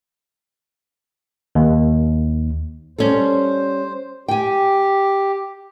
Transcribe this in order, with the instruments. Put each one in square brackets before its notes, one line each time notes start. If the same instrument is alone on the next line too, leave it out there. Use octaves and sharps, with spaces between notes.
[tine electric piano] D#2
[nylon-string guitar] G3 C#4 A4 [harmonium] C5
[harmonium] G4 [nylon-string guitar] G5 G#5